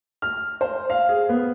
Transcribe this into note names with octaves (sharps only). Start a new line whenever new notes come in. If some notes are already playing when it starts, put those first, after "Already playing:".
F6
C5
F5
G#4
B3